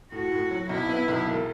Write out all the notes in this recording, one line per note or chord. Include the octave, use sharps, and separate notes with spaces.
A2 F#4
A2
F#3
B1 E4
B3
B1
E1